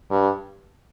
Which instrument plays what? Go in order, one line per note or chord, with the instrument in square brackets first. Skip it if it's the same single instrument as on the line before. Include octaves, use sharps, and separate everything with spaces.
[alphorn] G2